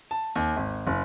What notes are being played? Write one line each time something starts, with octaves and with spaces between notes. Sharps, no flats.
A5
D#2
G#1
F#1